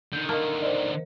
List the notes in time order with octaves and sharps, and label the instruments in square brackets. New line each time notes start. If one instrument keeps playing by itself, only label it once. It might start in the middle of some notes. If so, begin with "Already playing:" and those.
[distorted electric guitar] D3 D#3 [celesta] G6
[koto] A#3 [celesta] D#5 A5
[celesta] C5 D#5 [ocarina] D5